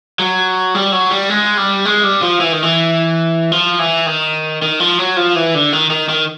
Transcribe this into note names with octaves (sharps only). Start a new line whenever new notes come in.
F#3
G3
F#3
G3
G#3
G3
G#3
G3
F3
E3
D#3
E3
F3
E3
D#3
D#3
F3
F#3
F3
E3
D3
D#3
D#3
D#3